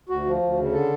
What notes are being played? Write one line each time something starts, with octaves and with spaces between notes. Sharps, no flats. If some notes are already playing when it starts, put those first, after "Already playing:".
D2 F#4
F3
D2
C#3
D3 A4